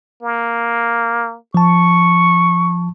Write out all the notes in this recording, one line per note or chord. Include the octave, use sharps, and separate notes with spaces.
A#3
F3 A5 C#6